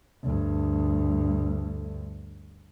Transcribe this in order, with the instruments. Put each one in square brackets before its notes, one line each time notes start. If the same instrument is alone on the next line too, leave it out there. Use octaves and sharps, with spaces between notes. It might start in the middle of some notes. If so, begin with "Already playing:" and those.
[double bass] D2 G2